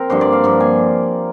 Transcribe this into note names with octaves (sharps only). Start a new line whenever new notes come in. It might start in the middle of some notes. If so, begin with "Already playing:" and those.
Already playing: C4 A#4
G2 D3 F3 A#3 C5
D5
F5
G2 D3 F3 A#3
G#5